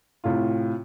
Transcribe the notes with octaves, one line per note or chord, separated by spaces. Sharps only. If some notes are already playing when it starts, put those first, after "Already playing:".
A2 C3 F4